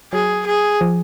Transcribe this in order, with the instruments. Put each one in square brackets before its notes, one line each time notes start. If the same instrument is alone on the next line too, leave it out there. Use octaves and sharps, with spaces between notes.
[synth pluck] F#3 [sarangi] G#4
[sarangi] G#4
[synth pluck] F3